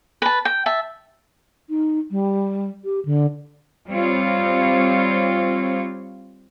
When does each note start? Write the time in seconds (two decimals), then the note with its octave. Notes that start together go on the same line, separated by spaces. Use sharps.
0.22 B4 A5
0.45 G5
0.66 E5 A5
1.70 D#4
2.11 G3
2.84 G4
3.05 D3
3.90 G3 C4 F4 C#5